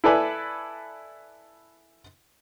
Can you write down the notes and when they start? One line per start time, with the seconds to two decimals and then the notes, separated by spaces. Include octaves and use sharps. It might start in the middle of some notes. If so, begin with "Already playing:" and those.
0.04 E4 A4 B4 D5 G#5 B5